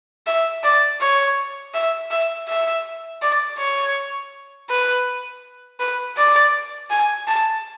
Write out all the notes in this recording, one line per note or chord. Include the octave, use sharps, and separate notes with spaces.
E5
D5
C#5
E5
E5
E5
D5
C#5
B4
B4
D5
G#5
A5